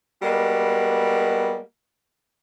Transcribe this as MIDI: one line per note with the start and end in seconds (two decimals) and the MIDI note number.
0.23 1.58 55
0.23 1.58 56
0.23 1.58 58
0.23 1.58 59
0.23 1.58 66